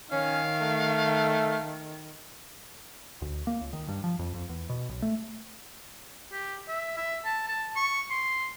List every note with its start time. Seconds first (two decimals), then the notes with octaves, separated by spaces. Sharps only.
0.12 D#3 C#4 F5
0.61 A3
3.22 D2
3.47 A#3
3.61 C#2
3.73 D#3
3.89 G2
4.04 F3
4.19 F2
4.34 F2
4.49 E2
4.69 B2
4.89 B1
5.02 A3
6.32 G4
6.68 E5
6.97 E5
7.25 A5
7.48 A5
7.76 C#6
8.10 C6